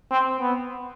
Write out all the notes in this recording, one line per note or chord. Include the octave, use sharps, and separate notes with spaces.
C4
B3